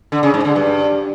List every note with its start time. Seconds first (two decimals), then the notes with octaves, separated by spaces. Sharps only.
0.12 D3
0.23 C#3
0.34 G#2
0.45 D3
0.56 G2